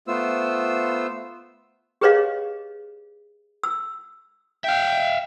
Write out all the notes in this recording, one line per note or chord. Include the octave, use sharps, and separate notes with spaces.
A3 B3 F4 C5 E6
G4 G#4 B4 C#5 D#5 F5
E6
E5 F5 G5